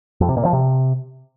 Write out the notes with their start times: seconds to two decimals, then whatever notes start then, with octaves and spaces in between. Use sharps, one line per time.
0.21 F2
0.29 C3
0.37 A#2
0.45 F3
0.53 C3